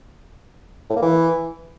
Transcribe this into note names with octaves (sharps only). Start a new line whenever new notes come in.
A2
A#3
E3